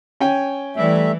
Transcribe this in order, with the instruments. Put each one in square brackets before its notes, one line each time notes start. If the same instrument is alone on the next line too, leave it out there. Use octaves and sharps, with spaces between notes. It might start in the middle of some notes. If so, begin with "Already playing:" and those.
[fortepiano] C#4 G5 G#5
[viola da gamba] E3 [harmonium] G3 A3 E5